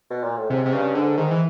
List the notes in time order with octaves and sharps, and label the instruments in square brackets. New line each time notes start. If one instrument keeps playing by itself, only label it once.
[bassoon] B2
A#2
A2
[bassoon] G#2 [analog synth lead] C3
[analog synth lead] C3
[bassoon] G2 [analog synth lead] C#3
[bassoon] G#2 [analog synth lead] D3
[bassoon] G#2 [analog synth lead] D#3
[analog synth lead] E3